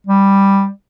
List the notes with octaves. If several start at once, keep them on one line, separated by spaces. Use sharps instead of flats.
G3